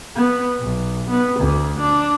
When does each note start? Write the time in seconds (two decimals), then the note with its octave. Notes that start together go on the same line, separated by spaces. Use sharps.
0.16 B3
0.60 B1
1.09 B3
1.40 D2
1.79 D4